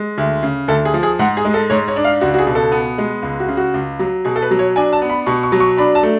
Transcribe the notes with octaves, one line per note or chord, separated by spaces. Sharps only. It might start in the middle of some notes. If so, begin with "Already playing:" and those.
Already playing: G#3
D2
C#3
D2 A4
G#4
F3
G#4
G#2 F#5
G#4
G#3
A4
G#2 C#5
C#5
D4
F5
C#2 F#4
F#4
G#4
B2
A4
B3
G#3
C#2
F#4
C#3
F#4
C#2
F#3
B2 G#4
A4
B4
F#3
C#5
D4 G#5
A5
B3
B5
B2 C#6
C#6
F#3
C#6
D4 B5
A5
A3